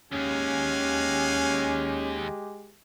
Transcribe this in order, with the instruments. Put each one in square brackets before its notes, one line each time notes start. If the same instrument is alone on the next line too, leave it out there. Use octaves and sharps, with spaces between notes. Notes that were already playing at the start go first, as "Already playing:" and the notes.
[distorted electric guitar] D#2 [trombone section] G#3 G4 [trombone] C#4 [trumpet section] F5 F#5 G#5